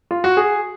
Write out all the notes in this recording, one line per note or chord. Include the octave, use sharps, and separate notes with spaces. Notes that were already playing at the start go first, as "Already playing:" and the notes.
F4
F#4
G#4